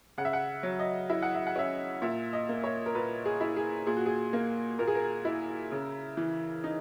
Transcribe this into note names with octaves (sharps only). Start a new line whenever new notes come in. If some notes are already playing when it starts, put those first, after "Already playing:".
C#3 F#5
E5
F#5
F#3
D#5
E4 E5
F#5
E5
F#5
C#4 E5
A#2 E5
D#5
A#3
C#5
A#4
A#2 B4
G#4
E4
G#4
A#2 G#4
F#4
G#4
A#3
A#2 A#4
G#4
A#4
E4
C#3
E3
D#4